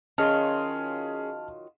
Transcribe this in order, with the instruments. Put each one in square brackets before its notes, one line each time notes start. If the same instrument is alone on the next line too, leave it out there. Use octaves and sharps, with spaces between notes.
[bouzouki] D#3 F#3 F4 [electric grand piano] C#4 G#4 [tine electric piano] A5 F6